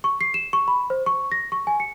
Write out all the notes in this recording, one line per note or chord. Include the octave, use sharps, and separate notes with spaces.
C#6
C7
E7
C#6
B5
C5
C#6
A#6
C#6
G#5
C#7